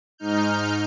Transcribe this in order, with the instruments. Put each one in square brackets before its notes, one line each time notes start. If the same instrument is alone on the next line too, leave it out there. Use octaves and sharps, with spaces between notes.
[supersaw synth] G#2 D#4 F6 G6